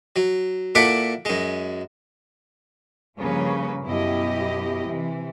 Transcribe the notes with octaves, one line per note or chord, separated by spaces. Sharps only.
F#3
A#2 E4 A4 F#5 B5 D6
F#2 G#3
G2 C#3 F3 A#3 B4 C#5
F#2 B2 E4 G4 D#5
C3 E3